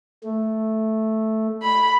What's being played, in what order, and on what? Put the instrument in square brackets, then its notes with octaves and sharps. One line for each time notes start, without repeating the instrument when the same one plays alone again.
[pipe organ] A3
[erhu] B5